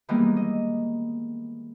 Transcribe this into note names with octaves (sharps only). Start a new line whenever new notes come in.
D#3 E3 G3 G#3 A#3 B3
D#5